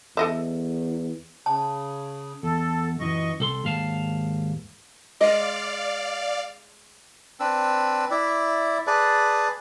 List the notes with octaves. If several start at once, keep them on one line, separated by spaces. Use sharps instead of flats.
E2 A4 D#5 E5
C#3 A5
E2 A4
F#2 E3 D#5 C#6
C2 A4 C6
D#2 G#2 F5 A5
G#3 D5 D#5 F5
C4 D4 B4 E6
E4 D5 E5
G#4 B4 D5 A5